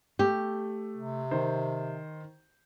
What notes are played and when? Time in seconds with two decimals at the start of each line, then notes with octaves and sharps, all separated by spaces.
0.19 A3 G4
0.97 C3
1.31 D#3 C5